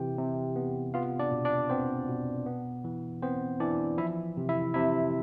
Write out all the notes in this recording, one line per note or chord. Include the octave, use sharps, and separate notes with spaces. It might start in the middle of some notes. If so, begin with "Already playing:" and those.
Already playing: C3 E3 G4 G5
C3
B3
B3 F4 F5
D4 D5
B2
D4 D5
B3 C4 C5
B2
B3
E3
B3 C4 C5
E3 D4 D5
F3 E4 E5
C3
E4 E5
C3 E4 E5